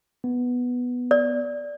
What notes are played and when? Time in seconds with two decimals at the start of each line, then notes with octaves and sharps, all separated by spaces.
0.24 B3
1.11 D5